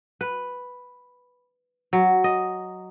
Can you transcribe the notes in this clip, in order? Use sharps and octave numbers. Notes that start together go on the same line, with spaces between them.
B4
F#3
D#5